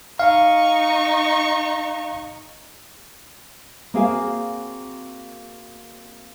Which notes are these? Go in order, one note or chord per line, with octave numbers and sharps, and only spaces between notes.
D#4 F5 C#6
A#3 C4 F#4 G#4 F5 G#5